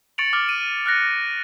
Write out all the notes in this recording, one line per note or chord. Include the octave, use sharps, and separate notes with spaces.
C#6 A6 C#7 D7 F7 F#7
D6 F6
D#7
F6 F#6 A#6 C#7